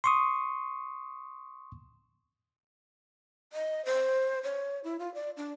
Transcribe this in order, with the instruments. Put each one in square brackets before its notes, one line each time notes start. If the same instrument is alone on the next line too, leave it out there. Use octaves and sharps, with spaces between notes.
[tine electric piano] C6 C#6 D#6
[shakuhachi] D#5
C5
C#5
E4
F4
D5
D4